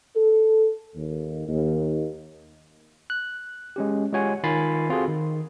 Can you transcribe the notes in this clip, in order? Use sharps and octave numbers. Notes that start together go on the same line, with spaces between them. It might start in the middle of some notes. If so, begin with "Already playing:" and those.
A4
D#2
D#2
F#6
G#3 C#4 G4
G#3 F4 G4 C#5 F#5 G#5
D#3 F4 G#5 B5 A6 C7
C4 F4 F#4 G#4 A4
D#3